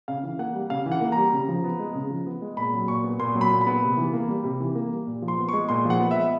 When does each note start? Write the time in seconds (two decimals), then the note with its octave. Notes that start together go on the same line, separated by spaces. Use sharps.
0.08 C#3 F5
0.23 E3
0.39 A#3 F#5
0.54 G3
0.70 C#3 F5
0.86 E3
0.92 F#5
1.01 A#3
1.12 G3 A#5
1.33 C#3
1.49 F3
1.64 B3
1.79 G#3
1.95 C#3
2.10 F3
2.26 B3
2.42 G#3
2.57 A#2 B5
2.74 F#3
2.88 A#2 C#6
3.04 B3
3.19 A#2 C6
3.35 F#3
3.41 B5
3.51 A#2
3.61 B5
3.67 B3
3.83 C3
3.97 E3
4.13 A#3
4.29 G3
4.44 C3
4.60 E3
4.75 A#3
4.92 G3
5.07 A#2
5.22 F3
5.28 C6
5.38 B3
5.49 G#3 C#6
5.69 A#2 C6
5.85 F3 F#5
6.00 B3
6.11 E5
6.16 G#3